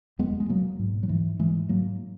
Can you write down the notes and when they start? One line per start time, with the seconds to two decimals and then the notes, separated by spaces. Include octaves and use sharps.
0.19 E2 G#3 B3
0.40 G#3
0.49 B2 F#3 A#3
0.79 G#2
1.03 F#3
1.09 G#2 E3
1.39 G#2 E3 G#3
1.69 G#2 F#3 A#3